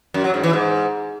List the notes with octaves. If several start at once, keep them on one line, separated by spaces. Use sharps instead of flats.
F#2
F#3
G#2
E3
G#2